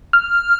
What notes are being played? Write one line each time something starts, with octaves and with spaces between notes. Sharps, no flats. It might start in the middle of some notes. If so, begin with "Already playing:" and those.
F6